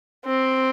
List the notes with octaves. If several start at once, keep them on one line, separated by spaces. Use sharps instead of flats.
C4